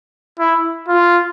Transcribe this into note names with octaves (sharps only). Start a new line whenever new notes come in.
E4
F4